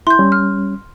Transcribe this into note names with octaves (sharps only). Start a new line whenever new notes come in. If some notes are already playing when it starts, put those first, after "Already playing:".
E4 C6 G6
G3 C#4
F6